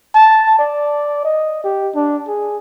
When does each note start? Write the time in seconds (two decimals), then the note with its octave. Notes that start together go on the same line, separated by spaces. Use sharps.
0.15 A5
0.59 D5
1.25 D#5
1.64 G4
1.95 D4
2.28 G#4